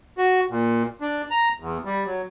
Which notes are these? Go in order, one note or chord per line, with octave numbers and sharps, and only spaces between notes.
F#4
A#2
D4
A#5
E2
G3
F#3